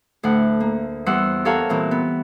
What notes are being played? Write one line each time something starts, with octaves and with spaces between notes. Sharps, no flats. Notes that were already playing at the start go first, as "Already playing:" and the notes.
D2 A2 F#5
A#3
E2 G3 C5 F#5 E6
G4 A4 A#4 C#5 F5 F#5
A#2 E3 C4
B3